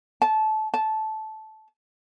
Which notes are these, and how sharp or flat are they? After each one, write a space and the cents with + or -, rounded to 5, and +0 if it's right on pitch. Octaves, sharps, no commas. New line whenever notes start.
A5 -20
A5 -15